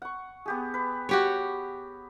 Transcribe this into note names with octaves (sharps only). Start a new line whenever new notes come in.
F#5 C#6
B3 G4 G#4
B4
F#4 G4 C#5